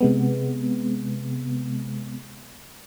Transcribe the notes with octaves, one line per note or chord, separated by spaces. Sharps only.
C3 G#3 B3